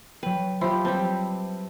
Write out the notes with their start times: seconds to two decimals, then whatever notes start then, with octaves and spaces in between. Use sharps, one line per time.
0.23 F#3 B4 G5
0.61 F3 G4 E5 B5 C6
0.85 G3 C4 B4 A5 G6